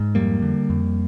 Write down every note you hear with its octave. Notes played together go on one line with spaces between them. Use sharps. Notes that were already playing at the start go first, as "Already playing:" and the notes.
Already playing: G#2
F2 G3 A#3
D3
F2